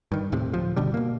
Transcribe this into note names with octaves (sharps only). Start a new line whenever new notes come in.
G2 D#3
D#1 A2 C3
D1 F3
G1 B2 D3 G3
B2 A#3